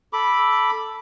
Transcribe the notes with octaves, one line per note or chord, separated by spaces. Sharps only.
A4 B5 D6